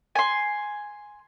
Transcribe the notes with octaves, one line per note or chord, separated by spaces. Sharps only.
G#5 C6